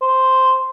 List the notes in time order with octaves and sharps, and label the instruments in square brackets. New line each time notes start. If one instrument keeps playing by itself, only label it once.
[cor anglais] C5